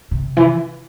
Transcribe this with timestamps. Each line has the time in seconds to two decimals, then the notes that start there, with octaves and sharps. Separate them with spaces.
0.11 C3
0.37 E3